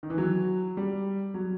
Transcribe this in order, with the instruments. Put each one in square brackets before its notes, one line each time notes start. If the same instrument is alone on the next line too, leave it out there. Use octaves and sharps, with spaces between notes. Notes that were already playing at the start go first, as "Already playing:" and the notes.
[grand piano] D#3
E3
F#3
G3
F#3